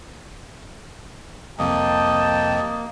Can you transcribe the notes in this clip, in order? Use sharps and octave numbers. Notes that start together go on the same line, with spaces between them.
C2 F2 C3 A#3 D#5 G5 A5